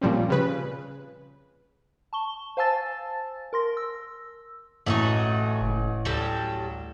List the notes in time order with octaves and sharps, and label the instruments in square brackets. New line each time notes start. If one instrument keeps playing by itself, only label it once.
[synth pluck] A#2 F3 G3 C4 C#4
C#3 B4
[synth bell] A5 C#6 G7
C5 F5 G#5 A5 E6 A6
A#4 C6 A#6
E6
[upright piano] A1 [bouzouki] A3 D#4 F#4
[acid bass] F#1
[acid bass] D2 [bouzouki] F#3 G3 A4